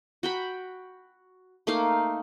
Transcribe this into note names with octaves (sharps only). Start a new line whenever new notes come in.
F#4 G5 B5
A3 A#3 D#4 F5